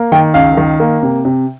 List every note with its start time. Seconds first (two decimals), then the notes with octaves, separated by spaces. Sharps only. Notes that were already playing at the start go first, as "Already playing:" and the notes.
Already playing: A#3
0.12 D#3 G5
0.34 C#2 F5
0.57 D#3
0.80 A#3
1.03 C3
1.25 C3